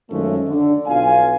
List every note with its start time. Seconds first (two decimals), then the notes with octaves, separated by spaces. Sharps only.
0.10 F#2 D#3 F3 G#3 A3
0.48 D3
0.87 B1 F4 F5 G#5